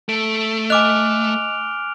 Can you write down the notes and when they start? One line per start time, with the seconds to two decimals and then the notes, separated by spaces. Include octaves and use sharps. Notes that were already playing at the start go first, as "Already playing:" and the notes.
0.09 A3 D7
0.70 D#5 G#5 D6 F6 F#6 F7